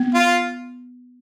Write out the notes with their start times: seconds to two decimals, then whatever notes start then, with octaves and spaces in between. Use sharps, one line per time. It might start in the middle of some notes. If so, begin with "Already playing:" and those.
Already playing: B3
0.14 F4